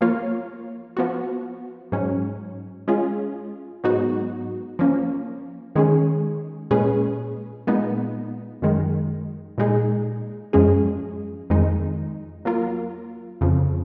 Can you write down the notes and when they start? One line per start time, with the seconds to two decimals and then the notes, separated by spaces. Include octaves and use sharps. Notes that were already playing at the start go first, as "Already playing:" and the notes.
0.01 F3 A#3 F4 A#4 C#5
0.97 F3 B3 F#4
1.92 G#2 F#3 C#4
2.88 G#3 C#4 F4 G#4
3.84 G#2 F#3 B3 D#4 F#4
4.79 F3 A#3 C#4
5.75 D#3 G#3 C#4 G#4
6.71 A#2 G#3 C#4 G#4 B4
7.67 A#2 G#3 B3 D#4
8.62 F#2 D#3 G#3
9.58 A#2 G#3 D#4 G#4
10.53 F#2 F3 G#3 C#4 G#4
11.50 F2 D#3 G#3 D#4
12.45 F#3 A#3 F4 A#4
13.41 F2 C#3 F3